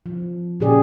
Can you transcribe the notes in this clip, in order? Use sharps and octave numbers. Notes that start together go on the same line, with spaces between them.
F3
A#2 C#3 G4 G#4 D5